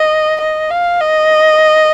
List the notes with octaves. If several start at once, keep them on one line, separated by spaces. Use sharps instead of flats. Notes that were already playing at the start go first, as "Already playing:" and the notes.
Already playing: D#5
D#5
F5
D#5